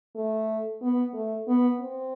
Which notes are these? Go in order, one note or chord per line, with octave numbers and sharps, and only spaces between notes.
A3
B3
A3
B3
C4